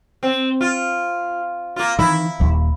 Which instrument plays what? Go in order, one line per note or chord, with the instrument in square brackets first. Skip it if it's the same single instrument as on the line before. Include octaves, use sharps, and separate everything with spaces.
[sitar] C4
F4
A#3 F4
[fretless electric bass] D#3 E3 [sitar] E4
[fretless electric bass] D#1 D#2